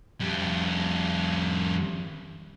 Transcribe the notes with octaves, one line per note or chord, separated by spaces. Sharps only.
F2 G3